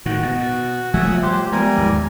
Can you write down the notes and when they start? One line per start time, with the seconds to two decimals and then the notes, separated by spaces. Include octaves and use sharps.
0.06 A2 D#3 F#4
0.23 B2
0.94 F3 G3 A3 E5 F#5 G#5
1.23 G4 C5
1.52 G3 G#3 B3 A#4 G#5
1.77 D#2 G#2